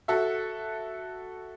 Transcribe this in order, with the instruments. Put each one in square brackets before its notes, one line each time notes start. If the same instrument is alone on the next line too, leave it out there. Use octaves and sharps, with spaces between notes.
[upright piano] F#4 A4 E5